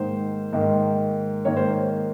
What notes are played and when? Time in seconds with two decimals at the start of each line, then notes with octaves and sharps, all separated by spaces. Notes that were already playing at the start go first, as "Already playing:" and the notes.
Already playing: G#2 D#3 A#3 C5
0.53 G#2 D#3 A#3
1.45 G#2 D#3 A#3 C#5
1.56 C5